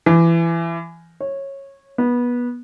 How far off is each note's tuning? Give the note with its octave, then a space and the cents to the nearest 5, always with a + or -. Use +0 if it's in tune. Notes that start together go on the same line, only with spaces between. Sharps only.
E3 +20
C#5 -15
B3 -20